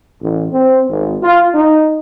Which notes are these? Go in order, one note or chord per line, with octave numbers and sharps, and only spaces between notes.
A1
C4
G#1
F4
D#4